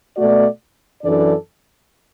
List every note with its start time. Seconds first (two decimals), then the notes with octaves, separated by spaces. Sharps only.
0.16 B2 A3 F#4 D5
1.02 F#2 E3 D4 A4 D5